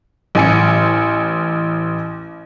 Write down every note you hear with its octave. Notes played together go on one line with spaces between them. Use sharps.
A1 G#5 C#7